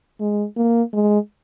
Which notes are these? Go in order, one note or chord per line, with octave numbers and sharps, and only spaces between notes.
G#3
A#3
G#3